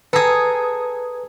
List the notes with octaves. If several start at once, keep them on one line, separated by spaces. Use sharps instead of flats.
G#4 A4 B4 A#5 D#6